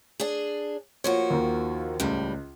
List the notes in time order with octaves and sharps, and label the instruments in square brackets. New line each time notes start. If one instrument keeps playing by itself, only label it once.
[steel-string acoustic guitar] D4 G#4
[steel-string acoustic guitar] F3 A#3 F#4 [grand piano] C#5
[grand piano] D#2 D#3
[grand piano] C#2 [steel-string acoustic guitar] A2 G3